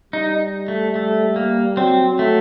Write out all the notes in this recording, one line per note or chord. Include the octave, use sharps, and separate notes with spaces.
G3 D#4
A3
A3
A#3
F#3 C4
A3